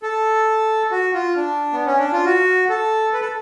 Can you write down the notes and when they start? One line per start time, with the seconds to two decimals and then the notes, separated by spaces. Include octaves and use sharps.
0.03 A4
0.91 F#4
1.14 F4
1.36 D4
1.73 B3
1.86 C#4
1.99 D4
2.12 F4
2.25 F#4
2.70 A4
3.13 B4
3.21 A4